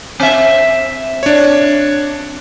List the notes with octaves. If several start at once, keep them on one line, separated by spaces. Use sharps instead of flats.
C4 E5
D4 C#5